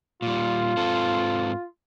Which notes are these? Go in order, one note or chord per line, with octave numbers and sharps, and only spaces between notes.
A#2 G3 F4
G#2 C4 A4